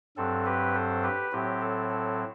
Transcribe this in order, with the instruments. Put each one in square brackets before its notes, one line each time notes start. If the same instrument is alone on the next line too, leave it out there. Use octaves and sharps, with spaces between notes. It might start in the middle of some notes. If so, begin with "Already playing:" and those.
[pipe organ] G2 F#3 C4 A4
G4 B4
A4 C5
G4 B4
A2 F#3 C4 G4
A4
A4